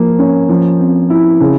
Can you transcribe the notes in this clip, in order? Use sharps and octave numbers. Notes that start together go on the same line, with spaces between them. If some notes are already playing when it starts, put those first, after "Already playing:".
Already playing: F3 A#3
C#4
F3
C4
E4
C#3